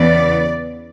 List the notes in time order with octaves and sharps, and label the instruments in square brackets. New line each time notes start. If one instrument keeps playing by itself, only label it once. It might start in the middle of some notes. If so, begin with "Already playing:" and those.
Already playing: [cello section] E2 C#3 E3 B3 D5